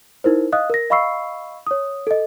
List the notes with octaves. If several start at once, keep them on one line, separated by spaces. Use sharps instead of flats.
D#4 E4 A#4 C5
D#5 F5 D#6 F#6
A#4 A#6
D#5 F5 B5 C#6 E6 C7
C#5 D#6
A4 D#5